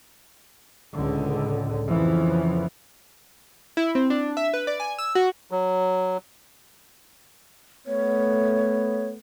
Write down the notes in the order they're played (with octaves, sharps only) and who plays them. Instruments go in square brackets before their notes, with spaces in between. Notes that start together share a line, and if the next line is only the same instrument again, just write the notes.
[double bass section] C#2 A2 D3
F2 C#3 E3 F3 B3
[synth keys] E4
C4
D4
E5
B4
D5
G#5
E6
F#4
[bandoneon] F#3
[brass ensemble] A3 B3 [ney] C#5